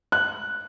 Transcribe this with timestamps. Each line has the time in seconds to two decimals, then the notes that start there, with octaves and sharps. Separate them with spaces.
0.12 F#6